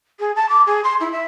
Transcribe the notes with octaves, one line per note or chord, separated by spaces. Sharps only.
G#4
A5
D6
G#4
C6
E4
E5